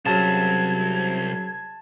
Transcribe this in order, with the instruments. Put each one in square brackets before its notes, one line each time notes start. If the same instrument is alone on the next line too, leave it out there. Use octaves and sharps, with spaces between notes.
[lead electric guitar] C2 [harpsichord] C#3 F#3 [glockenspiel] A5 A6 E7 [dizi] G#6